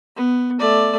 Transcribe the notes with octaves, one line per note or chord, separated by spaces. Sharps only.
B3
A3 D5